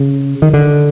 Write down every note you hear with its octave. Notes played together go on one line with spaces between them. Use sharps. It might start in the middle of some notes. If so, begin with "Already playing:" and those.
Already playing: C#3
D#3
D3